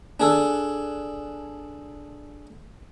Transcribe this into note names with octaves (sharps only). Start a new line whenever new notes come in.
D4 G#4 A4